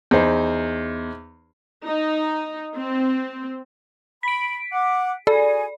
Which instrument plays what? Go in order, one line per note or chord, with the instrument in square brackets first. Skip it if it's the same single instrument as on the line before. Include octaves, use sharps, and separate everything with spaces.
[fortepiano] E2 D#4 C5
[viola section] D#4
C4
[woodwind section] B5 [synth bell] B6 D7
[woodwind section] F#5 D6
[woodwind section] F#4 G#4 G#5 [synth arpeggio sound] A4 [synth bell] D5